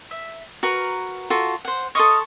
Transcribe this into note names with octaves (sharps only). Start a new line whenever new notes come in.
E5
F#4 A#4 B4
F4 F#4 A4
C5 F#5
A4 D#5 F5 C6 C#6 D#6